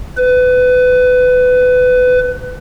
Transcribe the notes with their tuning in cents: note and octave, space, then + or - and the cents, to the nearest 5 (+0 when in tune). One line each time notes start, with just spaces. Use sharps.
B4 +25